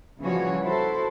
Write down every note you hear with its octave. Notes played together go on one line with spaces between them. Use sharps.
C#3 E3 F3 G3 F#4 C#5
E4 F#4 A4 C5